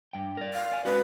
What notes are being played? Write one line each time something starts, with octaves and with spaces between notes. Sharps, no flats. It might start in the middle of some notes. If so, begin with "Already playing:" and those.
G2 G5
A#4 D5
F5
D5 G#5
G#3 C#4 F#4 B4